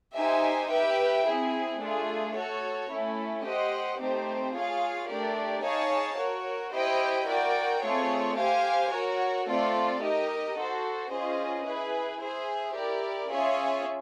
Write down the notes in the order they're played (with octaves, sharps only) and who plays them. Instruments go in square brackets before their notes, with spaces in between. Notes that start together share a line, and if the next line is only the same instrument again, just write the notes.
[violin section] D#4 G4 C5 E5 G#5
G4 B4 E5 G5
C4 E4 G#4
A3 D4 F4 G#4
F#4 A4 C#5
A3 C#4 E4
G4 C5 D#5 F#5
A3 C4 D#4 G4 C5
F4 G#4 C#5 F5
A3 D4 G4 A#4 D5
D#4 G#4 C#5 F5 A5
F#4 A#4 C#5
E4 G4 C5 D#5 G5
F#4 A#4 D5 G5
A3 C4 F4 G#4 C#5
G4 C5 F5 G#5
F#4 A#4 C#5
A3 C4 F4 A4 D5
D#4 G4 A#4 D#5
F#4 A4 C5
C#4 F4 G#4 C5 D#5
E4 G#4 B4
G#4 C5 E5
E4 G4 A#4 D5
C#4 F4 G#4 C#5 E5